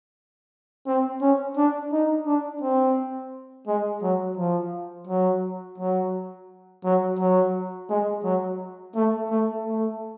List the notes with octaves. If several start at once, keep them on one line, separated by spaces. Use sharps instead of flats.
C4
C#4
D4
D#4
D4
C4
G#3
F#3
F3
F#3
F#3
F#3
F#3
G#3
F#3
A3
A3
A3